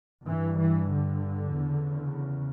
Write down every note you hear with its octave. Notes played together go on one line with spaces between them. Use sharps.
G2 E3
E3
D3
E2 C#3